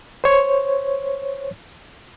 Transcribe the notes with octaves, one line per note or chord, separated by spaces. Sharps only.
C5 C#5